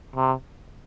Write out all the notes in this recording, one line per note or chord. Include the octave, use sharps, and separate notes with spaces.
C3